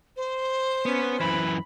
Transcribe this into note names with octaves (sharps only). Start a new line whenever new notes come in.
C5
B3 C#4
F#2 E3 B5